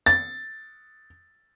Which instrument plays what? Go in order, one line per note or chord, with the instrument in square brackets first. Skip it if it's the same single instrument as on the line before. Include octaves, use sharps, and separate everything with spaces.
[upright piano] A6